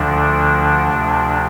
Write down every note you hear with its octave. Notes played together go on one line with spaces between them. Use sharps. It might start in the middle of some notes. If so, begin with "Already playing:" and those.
Already playing: D2 D3 F3 D4
D2 C3 F3